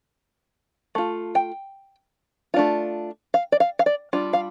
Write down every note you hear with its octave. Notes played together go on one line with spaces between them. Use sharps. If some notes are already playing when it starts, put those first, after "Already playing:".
A3 F4
G5
A3 D4 F4
F5
D5
F5
F5
D5
G3 D4 F4
F5